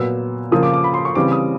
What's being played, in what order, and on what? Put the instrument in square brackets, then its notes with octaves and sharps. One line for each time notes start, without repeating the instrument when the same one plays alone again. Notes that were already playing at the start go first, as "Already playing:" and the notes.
Already playing: [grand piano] A#2 F#3 B3 E6
C#3 F3 A#3 D#6
D6
D6
B5
C6
C#6
C#3 E3 G3 C4 D6
D#6